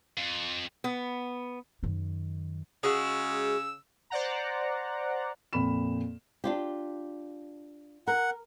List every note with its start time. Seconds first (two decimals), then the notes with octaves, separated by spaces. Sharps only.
0.17 F2
0.84 B3
1.83 F#2 D#3
2.83 C#3 G#3 F#4 E6
4.10 C5 D5 F#5 A#5
5.53 F2 A#2 B5 E7
6.44 D4 F4 G4
8.07 A#4 F#5